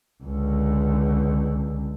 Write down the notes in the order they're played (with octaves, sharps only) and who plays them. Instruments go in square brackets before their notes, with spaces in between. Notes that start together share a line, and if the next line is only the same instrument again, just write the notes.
[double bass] C#2 D3